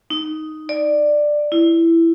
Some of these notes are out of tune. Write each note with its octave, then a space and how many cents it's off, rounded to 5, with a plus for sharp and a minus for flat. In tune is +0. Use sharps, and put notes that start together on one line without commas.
D#4 +5
D5 +10
E4 +10